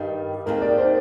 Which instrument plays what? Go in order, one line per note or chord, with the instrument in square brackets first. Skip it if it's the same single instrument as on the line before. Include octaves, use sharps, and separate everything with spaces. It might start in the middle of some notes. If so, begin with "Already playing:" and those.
Already playing: [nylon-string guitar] G2 D#3 G3
[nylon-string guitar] D#2 D#3 G#3 C4 [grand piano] A#4
[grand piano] D5
C5